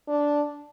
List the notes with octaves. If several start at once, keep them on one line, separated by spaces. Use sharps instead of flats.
D4